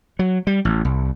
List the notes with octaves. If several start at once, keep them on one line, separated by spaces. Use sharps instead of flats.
F#3
G3
A1
C2